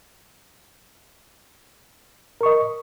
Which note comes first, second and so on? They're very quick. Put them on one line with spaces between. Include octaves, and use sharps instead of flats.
A#4 C#6 D#5